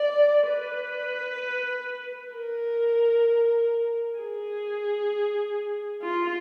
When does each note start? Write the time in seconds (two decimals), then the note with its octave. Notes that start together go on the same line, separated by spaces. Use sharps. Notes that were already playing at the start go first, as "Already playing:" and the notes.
Already playing: D5
0.49 B4
2.33 A#4
4.18 G#4
6.02 F4